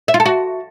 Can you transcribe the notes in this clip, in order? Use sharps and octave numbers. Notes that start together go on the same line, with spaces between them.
E5
F4
A4
F#4